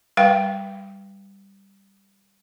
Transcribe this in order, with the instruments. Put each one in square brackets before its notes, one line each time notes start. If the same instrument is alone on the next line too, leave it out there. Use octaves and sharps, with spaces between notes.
[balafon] G3 B4 F5 G5